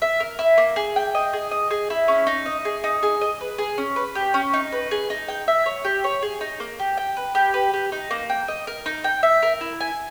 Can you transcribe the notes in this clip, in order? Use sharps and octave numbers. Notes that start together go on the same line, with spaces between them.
E5
A#4
E4
A#3
G#4
G5
D#5
G#4
D#5
G#4
E4
C#4
D#4
D#5
G#4
D#4
G#4
D#5
B4
G#4
C#4
B4
G4
C#4
D#4
B4
G#4
D#4
G5
E5
C#5
G4
C#5
G#4
D#4
A#3
G4
G5
B4
G4
B4
G4
D#4
A#3
G5
D#5
A#4
D#4
G5
E5
A#4
E4
G#5